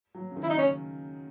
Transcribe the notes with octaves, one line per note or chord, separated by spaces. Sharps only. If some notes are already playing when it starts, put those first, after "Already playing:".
F#3
C#3
D#3
E4
D#4
C#3 C#4